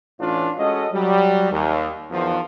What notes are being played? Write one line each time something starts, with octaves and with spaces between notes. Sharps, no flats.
A2 E3 C#4 D4 F4
G#3 C#4 F#4 A4 D#5
F#3 G3
D#2
E2 D#3 F3